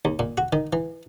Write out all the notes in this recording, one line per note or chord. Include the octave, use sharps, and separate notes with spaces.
D#2
A#2
F#4
D#3
E3